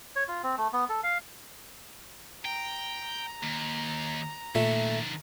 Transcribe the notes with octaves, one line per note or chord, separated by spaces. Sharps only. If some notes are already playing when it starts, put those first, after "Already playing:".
C#5
F4
C4
A3
B3
A4
F5
G5 A#5
D#2
A#2 D#3 A3 A4